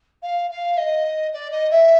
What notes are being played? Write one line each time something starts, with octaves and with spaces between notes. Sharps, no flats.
F5
F5
D#5
D5
D#5
E5